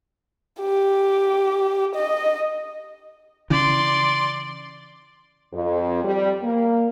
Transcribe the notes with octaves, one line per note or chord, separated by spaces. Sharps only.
G4
D#5
C#3 E3 D5 C6
F2
G3
A#3